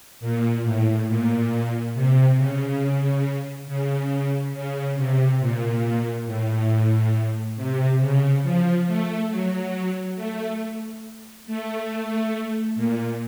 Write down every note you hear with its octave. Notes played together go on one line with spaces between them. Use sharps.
A#2
A2
A#2
C3
C#3
C#3
C#3
C3
A#2
A2
C3
C#3
F3
A3
F#3
A3
A3
A#2